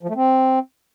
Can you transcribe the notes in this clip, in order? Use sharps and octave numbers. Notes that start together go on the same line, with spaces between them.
F3
A3
C4